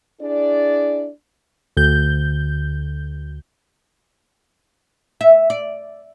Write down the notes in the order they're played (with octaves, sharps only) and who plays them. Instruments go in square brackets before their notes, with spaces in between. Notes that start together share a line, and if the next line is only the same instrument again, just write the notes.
[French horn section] D4 E4 G#4 D5
[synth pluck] D2 G6
[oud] E5
D5